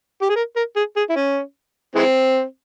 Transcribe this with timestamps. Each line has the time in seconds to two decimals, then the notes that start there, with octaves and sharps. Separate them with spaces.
0.21 G4
0.29 G#4
0.36 A#4
0.56 A#4
0.76 G#4
0.96 G#4
1.10 E4
1.16 C#4
1.95 E3 G#3 C4